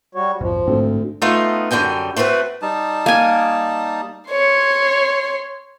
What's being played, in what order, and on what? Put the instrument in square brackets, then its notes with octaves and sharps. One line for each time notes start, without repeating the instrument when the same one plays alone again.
[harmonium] G3 F#4 C#5
[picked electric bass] B1 F2 G#2 [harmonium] F3
[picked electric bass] A1 G#2 C4 [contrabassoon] D2
[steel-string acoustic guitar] A3 B3 D#4 F4
F#2 D3 G3 G5 G#5
A3 C4 F#4 A#4 B4
[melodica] G3 D#4 A5
[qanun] A#3 G#5
[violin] C#5 C6